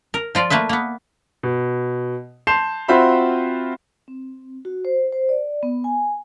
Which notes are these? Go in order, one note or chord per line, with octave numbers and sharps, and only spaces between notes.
A#4
F3 F4 D5
A3 A#3 B4 E5
A#3 B3
B2
A5 C6 G6 C7 E7 F7
C4 F4 F#4 C5 E5 B5
C4
F#4
C5
C5
D5
B3
G#5